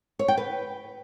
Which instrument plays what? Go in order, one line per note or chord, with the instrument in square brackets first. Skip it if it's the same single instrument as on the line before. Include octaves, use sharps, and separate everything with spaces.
[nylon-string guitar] C#5
G5
B4